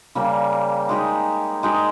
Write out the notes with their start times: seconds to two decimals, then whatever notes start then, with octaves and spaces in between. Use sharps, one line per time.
0.15 C#3 G3 A#3
0.89 G#3 D#4 G4
1.63 G#3 D#4 G4